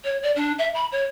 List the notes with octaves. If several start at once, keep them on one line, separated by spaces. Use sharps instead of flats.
C#5
D5
D4
E5
B5
C#5